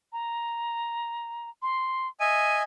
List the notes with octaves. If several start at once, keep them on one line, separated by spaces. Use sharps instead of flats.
A#5
C6
D#5 E5 G#5 D#7